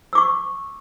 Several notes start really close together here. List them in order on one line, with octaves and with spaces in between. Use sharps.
E6 D6 C#6